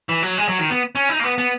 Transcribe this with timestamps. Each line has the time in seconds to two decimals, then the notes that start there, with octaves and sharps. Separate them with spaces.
0.09 E3
0.23 F#3
0.38 G#3
0.49 F#3
0.59 D#3
0.70 B3
0.95 C#4
1.09 D#4
1.20 A#3
1.24 B3
1.38 B3